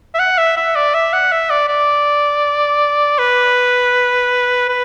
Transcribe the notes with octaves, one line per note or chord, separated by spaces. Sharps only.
E5
F#5
E5
E5
D5
E5
F#5
E5
D5
D5
B4
B4